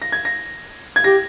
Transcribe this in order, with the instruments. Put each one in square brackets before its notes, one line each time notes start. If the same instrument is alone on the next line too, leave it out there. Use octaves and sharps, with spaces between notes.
[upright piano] A#6
G#6
A#6
G#6
[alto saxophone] G4 [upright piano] A#6